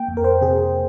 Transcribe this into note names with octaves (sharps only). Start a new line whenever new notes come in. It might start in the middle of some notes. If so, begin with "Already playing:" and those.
Already playing: A#3 G5
F2
A#4
C5
C3 G#4